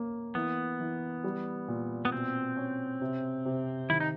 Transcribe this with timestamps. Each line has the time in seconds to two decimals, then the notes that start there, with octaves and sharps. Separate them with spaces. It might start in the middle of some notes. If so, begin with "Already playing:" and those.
Already playing: A#3 C#4
0.35 E3 B3
0.80 E3
1.24 G3
1.68 A#2
2.05 B3
2.12 B2 C4
2.57 C#4
3.01 C3
3.45 C3
3.90 D#3 E4
4.00 D#4